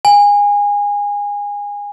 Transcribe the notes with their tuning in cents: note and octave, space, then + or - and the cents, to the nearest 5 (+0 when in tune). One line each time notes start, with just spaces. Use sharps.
G#5 -25